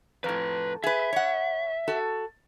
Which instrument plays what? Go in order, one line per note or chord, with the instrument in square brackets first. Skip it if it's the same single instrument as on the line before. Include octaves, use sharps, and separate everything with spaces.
[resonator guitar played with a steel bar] F2 A2 [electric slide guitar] B4 A#5
[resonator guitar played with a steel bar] G#4 B4 [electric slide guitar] E5
[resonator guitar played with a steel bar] C#5 F#5
F#4 A4